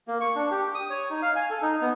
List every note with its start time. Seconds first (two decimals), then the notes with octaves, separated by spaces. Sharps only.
0.08 A#3
0.21 C#6
0.36 D4
0.51 G4
0.75 D#6
0.90 C#5
1.10 D#4
1.22 F5
1.36 G#5
1.50 A4
1.62 D#4
1.81 B3